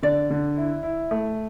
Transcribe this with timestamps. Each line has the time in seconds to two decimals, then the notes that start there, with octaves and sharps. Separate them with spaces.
0.03 D3 D5
0.30 D3
0.57 E4
0.83 E4
1.11 A3